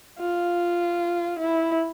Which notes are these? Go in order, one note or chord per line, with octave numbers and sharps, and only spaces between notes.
F4
E4